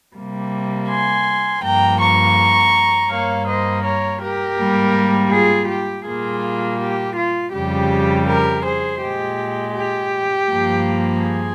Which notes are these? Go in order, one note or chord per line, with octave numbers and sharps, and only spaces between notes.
C3 G3 A#3
G#5 C6
G2 F3 A#3 G5 A#5
A#5 C#6
G2 G3 A#3 C#5 F5
C5 D#5
A#4 C#5
G4 A#4
G#2 G3 A#3
F4 G#4
G4
A#2 G3 A#3 F4 G#4
G4
F4
F2 C#3 G3 G4
G4 A#4
G#4 C5
A#2 G#3 G4
G4
G2 F3 A#3
F4 G#4